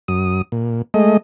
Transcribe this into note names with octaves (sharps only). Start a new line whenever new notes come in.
F#2 D#6
A#2
G#3 A3 D#5